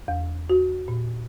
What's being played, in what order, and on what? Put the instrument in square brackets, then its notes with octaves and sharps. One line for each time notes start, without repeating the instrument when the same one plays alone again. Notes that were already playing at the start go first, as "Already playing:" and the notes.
[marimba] E2
F#4
A#2